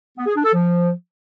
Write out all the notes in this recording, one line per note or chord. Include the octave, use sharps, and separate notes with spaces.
B3
G#4
D4
A4
F3